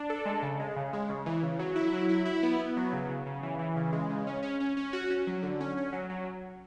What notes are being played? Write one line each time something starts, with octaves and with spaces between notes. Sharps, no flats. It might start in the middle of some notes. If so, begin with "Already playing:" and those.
Already playing: D4
A4
G#3
C#3
G#3
C#3
G#3
C#3
E3
C#3
F#3
E4
F#3
E4
E4
B3
B3
F#3
C#3
C#3
C#3
E3
E3
C#3
G#3
C#3
C#4
C#4
C#4
C#4
F#4
C#4
F#3
D3
C#4
C#4
F#3
F#3